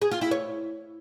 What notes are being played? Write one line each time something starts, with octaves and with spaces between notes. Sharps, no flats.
G#4
F4
E4
C#5